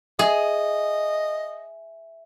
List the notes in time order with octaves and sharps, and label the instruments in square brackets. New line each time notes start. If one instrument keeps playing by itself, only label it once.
[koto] G#4 [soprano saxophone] D#5 [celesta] E5